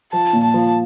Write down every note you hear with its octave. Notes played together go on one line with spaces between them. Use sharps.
F3 A5
A#2
A5
F3